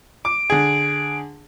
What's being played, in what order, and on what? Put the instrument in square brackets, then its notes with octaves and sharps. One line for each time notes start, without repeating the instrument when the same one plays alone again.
[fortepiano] D6 [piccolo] D7
[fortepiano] D3 G#4